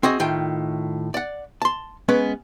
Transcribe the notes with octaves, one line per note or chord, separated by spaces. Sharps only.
C4 F#4 G#4 D#5
A2 D#3 F4 G5
D5 F#5
A5 C6
G#3 B3 C#4 B4